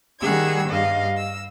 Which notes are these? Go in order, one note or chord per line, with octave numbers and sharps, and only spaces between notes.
D#3 G3 G#4 F#5 E6 G#6
G2 D#5 F5
E6